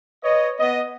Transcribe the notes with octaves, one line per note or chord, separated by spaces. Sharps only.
B4 C#5 D#5
B3 D#5